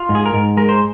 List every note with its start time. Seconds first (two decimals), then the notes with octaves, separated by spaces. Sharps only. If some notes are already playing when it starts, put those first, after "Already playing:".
Already playing: F4
0.09 G#2
0.15 G#4
0.26 A#4
0.34 G#2
0.57 G#3 A#4
0.69 C5